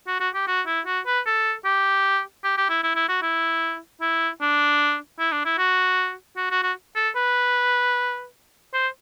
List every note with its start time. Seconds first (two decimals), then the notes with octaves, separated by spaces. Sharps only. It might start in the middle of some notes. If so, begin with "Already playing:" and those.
0.08 F#4
0.20 F#4
0.35 G4
0.47 F#4
0.67 E4
0.86 F#4
1.06 B4
1.26 A4
1.65 G4
2.44 G4
2.58 G4
2.70 E4
2.84 E4
2.96 E4
3.09 F#4
3.22 E4
4.01 E4
4.41 D4
5.20 E4
5.32 D4
5.45 E4
5.58 F#4
6.37 F#4
6.51 F#4
6.63 F#4
6.96 A4
7.16 B4
8.74 C5